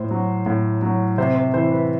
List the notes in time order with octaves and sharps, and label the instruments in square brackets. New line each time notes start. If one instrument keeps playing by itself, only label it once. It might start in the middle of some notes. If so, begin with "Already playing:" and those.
Already playing: [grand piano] A2 C5
F#3
A2
F#3
C3 C5
C5
E3 C5
B4